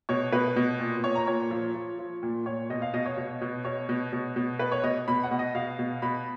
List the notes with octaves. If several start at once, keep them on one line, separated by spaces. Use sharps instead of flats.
B2 C#5
B2 B4
B2
A#2
A#2 C#5
A#5
A#2 C#5
F3
F3
F3
A#2
A#2 C#5
B2 D#5
F5
B2 D#5
C#5
B2
B2
B2 C#5
B2
B2
B2
B2 B4
C#5
B2 D#5
B2 B5
F#5
B2
D#5
B2 F5
B2
B2 B5